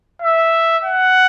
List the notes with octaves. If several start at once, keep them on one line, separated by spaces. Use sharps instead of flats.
E5
F#5